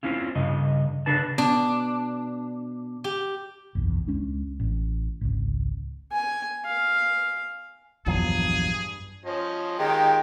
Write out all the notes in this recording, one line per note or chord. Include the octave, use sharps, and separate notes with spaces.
C4 C#4 E4 F4
G2 C#3 D#5
C#3 D4 B4 A5
B2 D4
G4
F#1 B1 E2
C#2 G#3 C#4 D4
A1
G#1 C#2
G#5
F5
A#1 E2 G2 F3 F#3 G#4
F3 C#4 D#5
D#3 G#3 F4 G4 G5